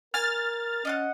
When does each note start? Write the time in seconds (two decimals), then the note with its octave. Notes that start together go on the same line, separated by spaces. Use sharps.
0.14 A#4 G#5 F6 A6
0.85 C#4 D#5 F5 F#5